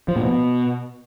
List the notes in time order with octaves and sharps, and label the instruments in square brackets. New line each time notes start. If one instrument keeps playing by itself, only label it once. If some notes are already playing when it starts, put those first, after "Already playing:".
[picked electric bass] F3
A#2
B2